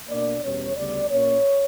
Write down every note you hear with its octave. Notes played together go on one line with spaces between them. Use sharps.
B2 A#3 D4 D5
E2 B2 G3 C#4 C#5
D2 C#3 G3 B3 D5
A#2 A#3 C#4 C#5